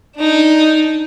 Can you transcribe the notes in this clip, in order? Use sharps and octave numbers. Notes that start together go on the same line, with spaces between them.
D4 D#4